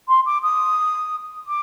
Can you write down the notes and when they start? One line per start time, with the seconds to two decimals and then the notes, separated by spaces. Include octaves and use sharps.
0.08 C6
0.26 D6
0.43 D#6
1.47 D6